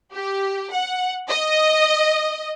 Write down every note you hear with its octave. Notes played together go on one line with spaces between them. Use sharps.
G4
F#5
D#5